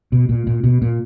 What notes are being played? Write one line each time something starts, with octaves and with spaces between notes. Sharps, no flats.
B2
A#2
A#2
B2
A#2